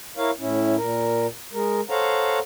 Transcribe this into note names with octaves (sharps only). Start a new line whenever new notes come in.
E4 A#4 C#5 F5
A2 C#4 E4
A#2 A#4
G#3 A#4
A4 C5 C#5 F5 F#5 A#5